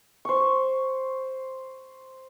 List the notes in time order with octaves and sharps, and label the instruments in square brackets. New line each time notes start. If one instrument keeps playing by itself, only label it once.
[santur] C5 C#6